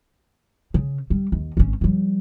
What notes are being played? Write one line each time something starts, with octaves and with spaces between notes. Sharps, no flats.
C#3
G3
D#2
G#1 C#4
F3 G3